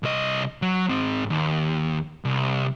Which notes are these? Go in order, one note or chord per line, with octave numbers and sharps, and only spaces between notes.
C2 D#5
F#3
G#2 C4
D#2
C2